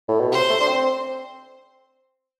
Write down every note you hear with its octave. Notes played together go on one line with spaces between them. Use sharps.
A2
B2
C3 C5
A3
D4
C4